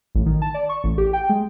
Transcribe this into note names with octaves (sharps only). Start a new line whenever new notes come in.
A1
D#3
A5
D5
C#6
A1
G4
G5
G#3